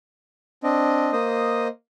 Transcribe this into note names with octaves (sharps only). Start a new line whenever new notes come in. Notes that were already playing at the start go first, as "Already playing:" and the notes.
C4 D4 D#5
A#3 C5 D#5 D#6